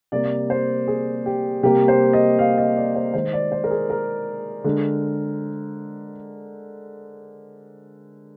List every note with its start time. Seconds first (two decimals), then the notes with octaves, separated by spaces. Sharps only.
0.12 C3 G3 A#3 D5
0.50 C5
0.87 G#4
1.26 G4
1.63 C3 G3 A#3 G4
1.88 C5
2.13 D#5
2.39 F5
2.58 D#5
2.76 D5
2.95 C5
3.14 D#3 G#3 C5
3.33 D5
3.52 C5
3.64 A#4
3.70 G#4
3.90 A#4
4.64 D3 G#3